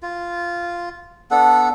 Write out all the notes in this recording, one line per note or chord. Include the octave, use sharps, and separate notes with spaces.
F4
B3 D4 A4 F#5